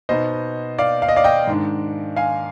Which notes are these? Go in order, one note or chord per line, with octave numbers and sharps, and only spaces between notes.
B2 B3 D#4 C5 D#5
D5 F5
F5
D#5
D5 F5
D#5 G5
G#2 D#3 G#3 D4
F5 G#5